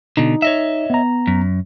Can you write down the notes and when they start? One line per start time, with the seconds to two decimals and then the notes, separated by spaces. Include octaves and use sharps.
0.17 B2 D3 D#4
0.42 C#5 D#5 E5
0.90 B3 A#5
1.27 F#2